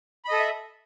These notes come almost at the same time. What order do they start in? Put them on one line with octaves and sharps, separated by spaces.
B5 D#5 A4 D#6 E5